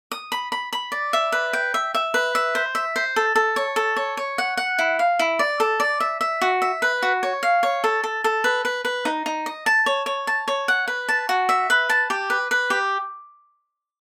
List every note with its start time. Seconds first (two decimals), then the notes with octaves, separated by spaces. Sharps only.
0.12 D#6
0.32 B5
0.52 B5
0.73 B5
0.92 D5
1.13 E5
1.32 B4
1.53 G5
1.74 E5
1.94 E5
2.14 B4
2.35 E5
2.55 C5
2.75 E5
2.96 C5
3.16 A4
3.36 A4
3.56 C#5
3.76 A4
3.96 C#5
4.17 C#5
4.38 F#5
4.57 F#5
4.79 E4
4.99 F5
5.19 E4
5.39 D5
5.60 A4
5.80 D5
6.00 E5
6.21 E5
6.42 F#4
6.62 E5
6.82 B4
7.02 F#4
7.23 C#5
7.43 F5
7.63 C#5
7.84 A4
8.04 A4
8.24 A4
8.44 B4
8.65 B4
8.85 B4
9.05 D#4
9.26 D#4
9.46 D#5
9.66 A5
9.86 C#5
10.06 C#5
10.27 A5
10.48 C#5
10.68 F#5
10.88 B4
11.09 A5
11.29 F#4
11.49 E5
11.70 B4
11.89 A5
12.10 G4
12.30 B4
12.51 B4
12.70 G4